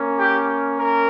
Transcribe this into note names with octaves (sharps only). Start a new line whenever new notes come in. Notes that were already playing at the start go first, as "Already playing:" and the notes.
Already playing: A#3 C#4
G4
A#4